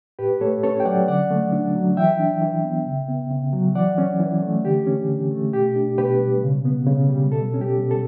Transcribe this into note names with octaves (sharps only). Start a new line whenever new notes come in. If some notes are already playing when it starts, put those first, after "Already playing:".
A2 G4 B4
A3 A4 C#5
C#4 A4 C#5
G5
F#3 D5 F#5
D3 D5 F#5
A3
D4
F#3
E3 E5 G5
D4
E3
B3
C#3
B3
C#3
F#3
E3 D5 F#5
C#4
E3
A3
D3 G4
C#4
D3
A3
B2 G4
D4
B2 G4 B4
G3
C#3
B3
C#3
G3
B2 A4
C#4
G4
B2
A4